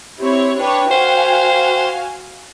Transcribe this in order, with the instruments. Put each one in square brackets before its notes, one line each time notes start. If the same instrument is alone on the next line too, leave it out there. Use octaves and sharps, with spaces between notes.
[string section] C4 E4 C#5 [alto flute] G4
[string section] D4 B4 C#5 [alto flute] G5
[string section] F#4 F5 G#5 [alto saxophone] C5